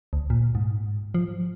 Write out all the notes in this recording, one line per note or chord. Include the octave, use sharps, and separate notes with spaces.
D2
A#2
G#2
F3